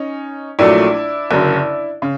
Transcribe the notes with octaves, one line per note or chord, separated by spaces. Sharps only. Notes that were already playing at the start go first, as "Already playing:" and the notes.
Already playing: C#4 D#4
A#1 A#2 F#3 A3 D4 E4
F#1 F#2 D3
C#3